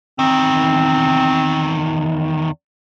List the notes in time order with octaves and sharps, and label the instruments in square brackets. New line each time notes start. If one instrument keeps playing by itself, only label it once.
[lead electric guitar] E2 D#3 [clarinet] C4